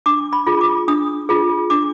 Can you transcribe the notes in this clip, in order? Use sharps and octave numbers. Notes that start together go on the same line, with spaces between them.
D4 D6
B5
F4 G#4
D6
D4 D#6
F4 G#4
D4 D6